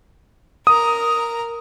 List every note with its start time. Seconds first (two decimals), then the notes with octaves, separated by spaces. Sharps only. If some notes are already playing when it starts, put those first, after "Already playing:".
0.67 A#4 A#5 D#6